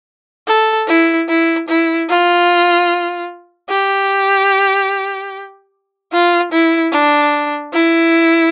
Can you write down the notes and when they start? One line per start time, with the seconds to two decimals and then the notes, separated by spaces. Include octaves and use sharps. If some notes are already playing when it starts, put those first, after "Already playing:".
0.47 A4
0.87 E4
1.28 E4
1.68 E4
2.09 F4
3.69 G4
6.12 F4
6.52 E4
6.92 D4
7.74 E4